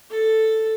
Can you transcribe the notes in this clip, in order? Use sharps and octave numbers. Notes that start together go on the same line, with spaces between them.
A4